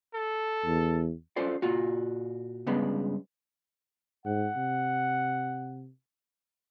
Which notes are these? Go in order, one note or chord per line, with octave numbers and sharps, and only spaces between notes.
A4
E2
C#4 F4 A4 C5 D5
A#2 F4 F#4
G2 C#3 G#3 B3
G#2 F#5
C3